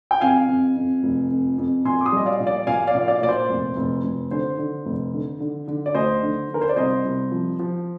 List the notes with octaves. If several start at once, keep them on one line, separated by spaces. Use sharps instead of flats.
G5
F2 F5 G#5
F2
F2
F1
F2
F2
A#1 G#5 C6
D6
C6 D#6
G3 D#5
D5 F5
A#1
D5 F5
A#1 F5 G#5
D5 F5
A#1
D5 F5
A#2 D5
C5
F1
F1
F1
D3 C5
D3
F1
D3
D3
D3
D5
D2 C5 D#5
D3
D3 A#4
C5
D5
C2 C5 D#5
C2
F3
F3